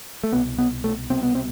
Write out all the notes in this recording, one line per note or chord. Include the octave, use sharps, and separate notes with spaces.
A3
C2 B2 B3
B3
A3
C2 B2 C4
B3
C4